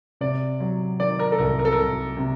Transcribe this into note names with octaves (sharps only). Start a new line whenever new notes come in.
C3 D5
F#3
D#3 D5
A#4
A4
C2 A#4
A#4
A4
A#4
C2
C3